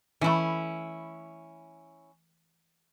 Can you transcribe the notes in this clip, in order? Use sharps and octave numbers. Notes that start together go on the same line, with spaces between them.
E3 A3 C#4 E4